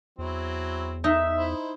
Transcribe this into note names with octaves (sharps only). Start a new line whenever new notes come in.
E2 F#3 C4 E4
D#4 E5
E4 C5